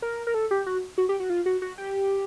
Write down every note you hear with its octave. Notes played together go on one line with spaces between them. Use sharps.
A#4
A#4
A4
G4
F#4
F#4
G4
F#4
F4
F#4
F#4
G4